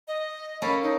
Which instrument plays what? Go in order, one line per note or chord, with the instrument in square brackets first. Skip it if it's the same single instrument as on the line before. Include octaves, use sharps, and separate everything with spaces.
[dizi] D#5
[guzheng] A#3 C#4 A4 [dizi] B5
[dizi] D#4